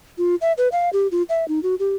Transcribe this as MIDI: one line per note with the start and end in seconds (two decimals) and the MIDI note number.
0.18 0.35 65
0.41 0.52 76
0.58 0.68 71
0.72 0.89 77
0.93 1.07 67
1.12 1.23 65
1.29 1.47 76
1.48 1.62 63
1.63 1.75 66
1.79 1.96 67